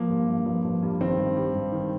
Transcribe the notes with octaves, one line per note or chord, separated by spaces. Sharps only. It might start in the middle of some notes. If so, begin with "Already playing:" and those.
Already playing: F3 A#3
G2
G2
F3
F3
G2
D#3 C4
G2
G3
G2
D#3